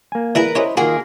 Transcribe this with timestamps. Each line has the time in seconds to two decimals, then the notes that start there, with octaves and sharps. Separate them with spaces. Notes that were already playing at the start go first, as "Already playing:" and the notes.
0.12 A#3 G#5
0.35 E3 E4 G#4 A#4 B4
0.55 C#4 E4 G4 C5 C#5 D#5
0.77 D#3 A#3 F4 F#4 G#4